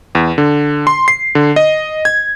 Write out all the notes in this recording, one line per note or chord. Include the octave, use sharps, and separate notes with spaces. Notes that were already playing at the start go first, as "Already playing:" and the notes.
E2
D3
C6
C7
D3
D#5
G#6